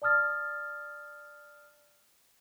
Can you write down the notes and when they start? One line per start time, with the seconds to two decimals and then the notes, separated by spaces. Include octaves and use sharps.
0.02 D5 A5 D#6 F6 A6